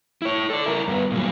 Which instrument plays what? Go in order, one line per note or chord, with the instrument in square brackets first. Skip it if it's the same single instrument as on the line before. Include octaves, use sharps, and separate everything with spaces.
[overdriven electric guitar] E4 C#5
A4 D5
E4 A#4
G2 B3
A#2 F#3